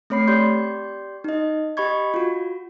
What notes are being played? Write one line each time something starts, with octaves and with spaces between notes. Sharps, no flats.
A3 C4 C#5 B5 C7
G4 D5 C6 G6
D#4 D#5
G4 D#5 B5 C#6 G#6
F4 F#4